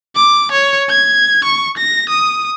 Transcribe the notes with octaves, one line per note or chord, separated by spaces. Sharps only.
D6
C#5
G#6
C#6
A#6
D#6